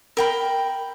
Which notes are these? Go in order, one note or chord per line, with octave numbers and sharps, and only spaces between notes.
A#4 G5 B5